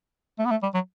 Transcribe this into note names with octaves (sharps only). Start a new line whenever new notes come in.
A3
B3
A3
G3
F#3